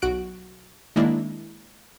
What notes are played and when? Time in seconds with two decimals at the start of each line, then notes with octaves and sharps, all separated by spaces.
0.02 B1 F#4 F#6 D7
0.96 D#3 G#3 A#3 D4 E4